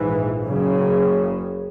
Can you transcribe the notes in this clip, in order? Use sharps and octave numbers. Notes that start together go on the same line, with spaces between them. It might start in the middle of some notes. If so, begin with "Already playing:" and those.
Already playing: A#1 G#2 E3
F#1 F#2 C#3